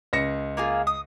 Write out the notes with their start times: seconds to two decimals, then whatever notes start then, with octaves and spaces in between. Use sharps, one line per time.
0.13 C#2 A#6 C#7
0.57 A#3 F4 G#4
0.87 D#6